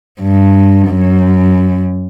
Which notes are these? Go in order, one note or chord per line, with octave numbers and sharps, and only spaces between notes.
G2
F#2